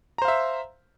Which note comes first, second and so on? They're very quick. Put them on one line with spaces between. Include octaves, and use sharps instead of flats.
A#5 C5 F5 E5